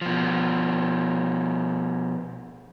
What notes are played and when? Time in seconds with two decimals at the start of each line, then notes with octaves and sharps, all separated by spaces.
0.01 B2 F3